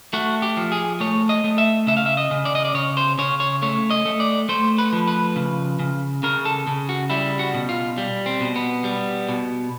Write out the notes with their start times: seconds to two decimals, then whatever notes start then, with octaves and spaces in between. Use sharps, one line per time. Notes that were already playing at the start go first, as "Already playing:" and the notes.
0.13 A3 F#4
0.42 G4
0.57 F3
0.72 G#4
1.00 A3 C#5
1.29 D#5
1.44 A3
1.58 E5
1.87 C#3 E5
1.97 F5
2.06 E5
2.17 D#5
2.31 C#3
2.45 D5
2.55 D#5
2.65 D5
2.74 C#3 C#5
2.97 C5
3.18 C#3 C#5
3.40 C#5
3.62 A3 C#5
3.90 D#5
4.05 A3
4.20 D5
4.49 A3 C5
4.78 B4
4.93 F3
5.07 B4
5.36 C#3
5.79 C#3
6.23 C#3 A#4
6.45 A4
6.67 C#3
6.89 F#4
7.10 G3 E4
7.39 F#4
7.54 B2
7.69 F4
7.98 G3
8.26 C4
8.41 B2
8.55 B3
8.84 G3
9.29 B2